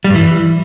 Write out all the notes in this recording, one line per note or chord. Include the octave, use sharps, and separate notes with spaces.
G3
G2
E3